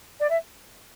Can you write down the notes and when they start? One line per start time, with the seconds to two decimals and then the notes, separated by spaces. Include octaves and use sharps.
0.20 D5
0.29 E5